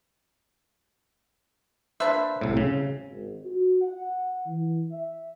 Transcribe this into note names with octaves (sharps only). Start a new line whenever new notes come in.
A#3 D4 B4 C5 E5
C2 A2
C#3
G#1
F#4
F#5
E3
E5